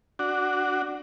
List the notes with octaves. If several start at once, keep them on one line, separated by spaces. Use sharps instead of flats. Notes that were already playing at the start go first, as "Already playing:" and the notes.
D4 F#4